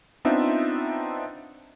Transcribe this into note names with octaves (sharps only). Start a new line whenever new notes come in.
B3 C4 D4 D#4 F4 E5